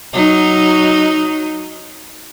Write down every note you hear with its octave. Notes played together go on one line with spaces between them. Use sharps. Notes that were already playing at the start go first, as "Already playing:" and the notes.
F#3 D#4